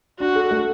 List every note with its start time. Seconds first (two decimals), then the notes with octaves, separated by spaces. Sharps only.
0.20 D4 F#4
0.35 A4
0.51 A3